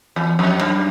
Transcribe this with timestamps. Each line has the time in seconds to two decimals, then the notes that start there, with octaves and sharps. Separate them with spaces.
0.16 E2
0.39 F2
0.61 F#2